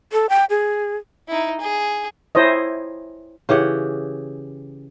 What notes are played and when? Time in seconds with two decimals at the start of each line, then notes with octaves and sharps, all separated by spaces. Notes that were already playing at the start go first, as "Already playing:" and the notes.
0.12 A4
0.29 G5
0.50 G#4
1.28 D#4 E4
1.61 G#4
2.35 E4 C5 C#5 D#5
3.49 C#3 E3 G4 F#5